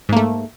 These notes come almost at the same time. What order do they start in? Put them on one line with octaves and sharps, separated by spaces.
G#2 A#3 A3